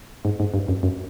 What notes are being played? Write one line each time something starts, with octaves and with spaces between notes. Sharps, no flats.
G#2
G#2
G2
F#2
F#2